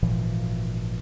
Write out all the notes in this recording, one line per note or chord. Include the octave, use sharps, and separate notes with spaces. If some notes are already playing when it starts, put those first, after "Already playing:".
G#1 A#2 E3 F3